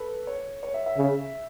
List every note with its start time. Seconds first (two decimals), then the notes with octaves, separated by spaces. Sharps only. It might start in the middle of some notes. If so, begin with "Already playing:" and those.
Already playing: A4 B4
0.27 C#5
0.63 C#5
0.74 E5
0.86 E5
0.97 C#3